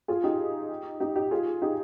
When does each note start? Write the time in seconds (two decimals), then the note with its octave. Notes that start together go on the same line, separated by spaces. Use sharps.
0.08 F4 G#4
0.24 D#4 G4
1.00 D#4 G4
1.15 D#4 G4
1.31 F4 G#4
1.62 D#4 G4